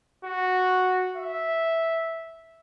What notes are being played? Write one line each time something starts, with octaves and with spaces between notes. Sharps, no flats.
F#4
E5